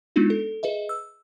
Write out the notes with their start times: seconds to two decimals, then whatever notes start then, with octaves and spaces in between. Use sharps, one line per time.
0.16 G#3 B3 D4 D#4 F4 F#4
0.30 A4
0.63 G#4 B4 D#5 E5
0.89 E6